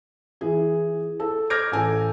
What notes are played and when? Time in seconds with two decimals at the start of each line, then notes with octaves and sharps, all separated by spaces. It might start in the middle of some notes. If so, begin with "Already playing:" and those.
0.41 E3 G#4
1.20 A4
1.50 D6 F6 G6 G#6 A#6 D7
1.72 A1 A4 G#5